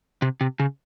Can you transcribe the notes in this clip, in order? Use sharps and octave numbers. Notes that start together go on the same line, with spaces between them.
C3
C3
C#3